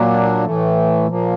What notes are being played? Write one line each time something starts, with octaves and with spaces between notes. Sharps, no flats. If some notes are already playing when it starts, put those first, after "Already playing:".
Already playing: A#2 F#3 A#3 D4
A2 E3 A3
A#2 F3 A#3